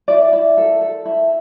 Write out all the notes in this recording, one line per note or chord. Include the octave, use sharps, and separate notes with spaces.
E4 D5
E4
A4
A4
E4